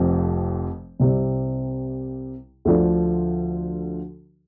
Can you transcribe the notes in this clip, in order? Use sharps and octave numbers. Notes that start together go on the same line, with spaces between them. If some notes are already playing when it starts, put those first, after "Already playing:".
Already playing: F1 F2 F3 C4
C2 C3 G3
D2 D3 F3 D4 A4